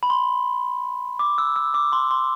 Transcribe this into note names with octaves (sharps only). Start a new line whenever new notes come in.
B5
C6
D6
E6
E6
D6
C6
C6